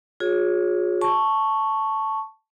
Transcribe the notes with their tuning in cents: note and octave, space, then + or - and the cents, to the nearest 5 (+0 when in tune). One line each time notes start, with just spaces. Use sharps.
F4 +45 G#4 +0 C#5 +0
A5 +0 C#6 +0